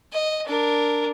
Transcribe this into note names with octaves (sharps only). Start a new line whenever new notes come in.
D#5
D4 A#4